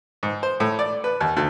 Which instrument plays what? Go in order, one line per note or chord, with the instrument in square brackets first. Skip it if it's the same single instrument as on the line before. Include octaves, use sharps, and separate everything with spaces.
[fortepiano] G#2
C5
A2
D5
B4
D#2
D2